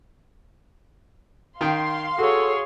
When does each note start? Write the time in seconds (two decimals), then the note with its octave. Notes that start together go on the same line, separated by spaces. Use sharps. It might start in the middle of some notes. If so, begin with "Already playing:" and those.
1.61 D#3 F5 G5 C6
2.18 F#4 G#4 A4 C#5